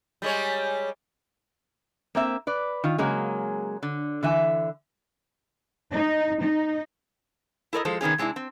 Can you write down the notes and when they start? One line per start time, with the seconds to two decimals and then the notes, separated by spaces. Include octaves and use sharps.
0.22 G3 G#3 C#5
2.15 A#3 C4 E5
2.47 B4 D5
2.84 D#3 F4
2.98 C#3 F#3 G#3 A#3 G#4
3.83 D3
4.23 D3 E3 E5 G#5
5.95 D#4
6.43 D#4
7.73 E4 A4 A#4 D5 D#5
7.85 F3 G#3 A4 C5
8.01 C3 D#3 B3 C#4 G#4
8.18 C3 G#3 C4 D4 E4
8.36 C4